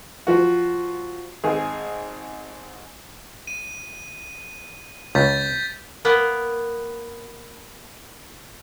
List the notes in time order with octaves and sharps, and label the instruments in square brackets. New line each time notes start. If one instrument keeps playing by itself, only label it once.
[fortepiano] F3 F#4
G#1 G#4
[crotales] D#7
[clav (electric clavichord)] C#2 [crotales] G6 A6 B6
[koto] A#3 B3